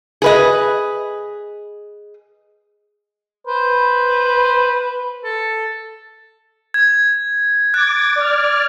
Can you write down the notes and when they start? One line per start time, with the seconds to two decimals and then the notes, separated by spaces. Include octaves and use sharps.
0.22 G#4 B4 D#5
3.47 B4 C5
5.24 A4
6.74 G#6
7.74 D6 F#6 G#6 A6
8.16 D5 F6